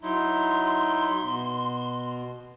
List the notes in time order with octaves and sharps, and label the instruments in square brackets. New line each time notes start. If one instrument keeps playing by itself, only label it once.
[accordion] F#3 D#4 E4 [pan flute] C6
[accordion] B2